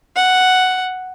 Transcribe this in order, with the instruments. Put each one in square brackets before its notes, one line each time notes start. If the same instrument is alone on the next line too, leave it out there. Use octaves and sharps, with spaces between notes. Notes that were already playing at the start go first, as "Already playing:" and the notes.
[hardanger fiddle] F#5